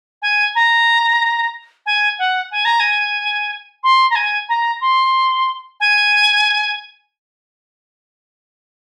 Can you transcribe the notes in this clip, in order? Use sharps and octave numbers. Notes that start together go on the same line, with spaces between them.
G#5
A#5
G#5
F#5
G#5
A#5
G#5
C6
A#5
G#5
A#5
C6
G#5